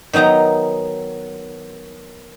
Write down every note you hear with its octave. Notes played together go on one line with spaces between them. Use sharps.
D#3 F#3 B3 D#4 A#5